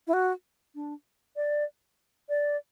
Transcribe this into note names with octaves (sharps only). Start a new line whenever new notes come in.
E4
F#4
D4
D5
D5